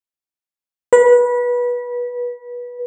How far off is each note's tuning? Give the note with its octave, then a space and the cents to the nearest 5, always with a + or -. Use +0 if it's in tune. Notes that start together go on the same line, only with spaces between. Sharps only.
B4 -25